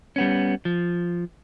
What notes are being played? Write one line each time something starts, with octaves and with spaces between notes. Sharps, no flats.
G3 B3 C#4
F3